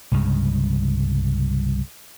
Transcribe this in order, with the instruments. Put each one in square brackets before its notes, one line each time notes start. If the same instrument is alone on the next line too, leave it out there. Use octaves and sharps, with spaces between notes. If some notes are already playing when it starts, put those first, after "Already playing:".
[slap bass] C2 G2 C#3 G#3